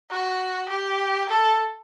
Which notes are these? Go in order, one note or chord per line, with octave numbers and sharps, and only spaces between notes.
F#4
G4
A4